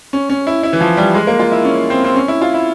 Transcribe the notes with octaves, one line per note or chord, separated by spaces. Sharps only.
C#4
C#4
E4
E4
E3
F3
G3
G#3
A#3
F4
E4
C#4
C4
C4
C#4
E4
F4
E4